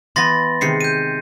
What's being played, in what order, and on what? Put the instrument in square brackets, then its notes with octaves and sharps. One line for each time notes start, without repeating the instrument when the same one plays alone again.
[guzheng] E3 B3 [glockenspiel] C6 A6 A#6
[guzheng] C3 D#3 G#3 [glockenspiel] C7 C#7
[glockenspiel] G6 D#7